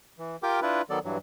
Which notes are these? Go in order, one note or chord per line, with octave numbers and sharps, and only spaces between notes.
E3
F4 G4 A#4 G5 D6
D4 E4 F4 B4
D#3 F#3 B3 A4 D5
G2 E3 F#3